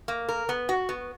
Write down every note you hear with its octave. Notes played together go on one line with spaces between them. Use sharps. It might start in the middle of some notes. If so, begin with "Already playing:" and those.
A#3
A#4
B3
F#4
B3